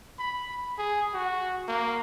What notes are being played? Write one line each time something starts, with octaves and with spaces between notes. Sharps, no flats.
B5
G#4
F#4
A#3